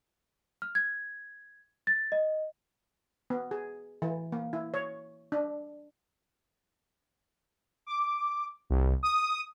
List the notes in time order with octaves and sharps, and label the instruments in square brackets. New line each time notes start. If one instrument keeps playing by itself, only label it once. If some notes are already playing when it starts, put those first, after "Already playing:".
[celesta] F6
G#6
A6
D#5
[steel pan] B3
G#4
E3
A#3
E4
C#5
D4
[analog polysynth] D6
C2
D#6